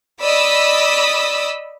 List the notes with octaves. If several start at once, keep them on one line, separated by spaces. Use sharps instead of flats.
D5 D#5 B5 D#6 E6